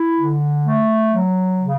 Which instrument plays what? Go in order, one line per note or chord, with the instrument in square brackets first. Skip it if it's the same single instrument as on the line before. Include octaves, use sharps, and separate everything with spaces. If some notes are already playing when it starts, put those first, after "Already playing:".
Already playing: [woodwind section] E4
D3
A3
F#3
C#3